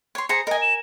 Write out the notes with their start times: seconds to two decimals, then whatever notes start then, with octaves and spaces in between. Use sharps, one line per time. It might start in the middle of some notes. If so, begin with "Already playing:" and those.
0.15 C#5 C6
0.29 G#4 C5 A#5 C#7
0.47 A#4 D#5 G#5
0.62 E7